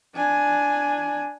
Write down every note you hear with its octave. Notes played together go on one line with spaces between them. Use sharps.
D4 G#5